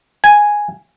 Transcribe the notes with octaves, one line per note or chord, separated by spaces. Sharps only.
G#5